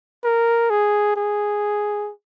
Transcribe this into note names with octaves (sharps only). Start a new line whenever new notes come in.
A#4
G#4
G#4